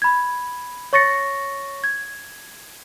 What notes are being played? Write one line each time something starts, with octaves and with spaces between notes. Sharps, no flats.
B5 G#6
C#5 C#6 A6 A#6 C#7
G#6